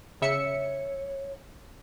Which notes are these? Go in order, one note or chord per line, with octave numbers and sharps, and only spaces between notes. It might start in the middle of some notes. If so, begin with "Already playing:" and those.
C#3 C#5 E5 C#7